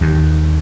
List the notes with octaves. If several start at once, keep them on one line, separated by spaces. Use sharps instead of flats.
D#2